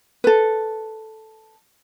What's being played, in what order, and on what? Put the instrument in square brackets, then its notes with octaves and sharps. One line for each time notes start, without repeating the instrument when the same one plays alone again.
[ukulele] A4 B4